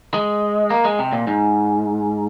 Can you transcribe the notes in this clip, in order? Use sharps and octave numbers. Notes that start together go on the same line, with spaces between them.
G#3
A#3
G#3
C3
A#2
G#2